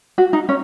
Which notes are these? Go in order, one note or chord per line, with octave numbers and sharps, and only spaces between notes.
F#4
D#4
C#4